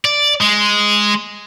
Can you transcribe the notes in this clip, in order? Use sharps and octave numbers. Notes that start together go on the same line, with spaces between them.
D5
G#3